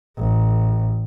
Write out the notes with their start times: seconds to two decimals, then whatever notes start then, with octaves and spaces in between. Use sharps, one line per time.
0.17 A1